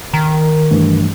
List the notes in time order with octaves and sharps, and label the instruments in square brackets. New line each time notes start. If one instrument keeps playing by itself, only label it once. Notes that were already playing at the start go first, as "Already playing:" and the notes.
[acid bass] D#3 [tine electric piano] A#5
[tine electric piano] G2 E3 A3